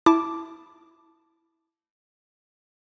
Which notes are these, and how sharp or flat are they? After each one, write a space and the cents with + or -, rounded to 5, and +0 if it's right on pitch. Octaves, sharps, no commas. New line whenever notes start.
E4 +0 A5 -5 D6 +0